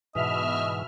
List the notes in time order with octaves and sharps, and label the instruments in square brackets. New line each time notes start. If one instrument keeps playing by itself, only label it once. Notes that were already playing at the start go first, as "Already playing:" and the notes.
[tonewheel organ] G#2 E3 [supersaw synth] B2 E5 F6 [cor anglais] D#5